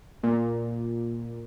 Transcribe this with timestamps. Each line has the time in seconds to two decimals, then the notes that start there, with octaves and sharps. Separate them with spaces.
0.23 A#2